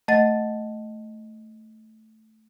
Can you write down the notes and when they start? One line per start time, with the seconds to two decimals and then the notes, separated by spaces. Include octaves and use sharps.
0.08 A3 D#5 F#5 A6